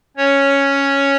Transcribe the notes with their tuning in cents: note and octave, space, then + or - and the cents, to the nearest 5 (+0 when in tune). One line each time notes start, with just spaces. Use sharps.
C#4 +0 C#5 +0